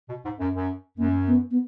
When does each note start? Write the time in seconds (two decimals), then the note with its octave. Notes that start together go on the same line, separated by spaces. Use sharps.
0.09 B2
0.24 G#2
0.39 F#2
0.54 F#2
0.98 F#2 A#3
1.27 B3
1.51 B3